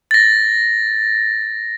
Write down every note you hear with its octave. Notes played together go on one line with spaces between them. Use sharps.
A6 A#6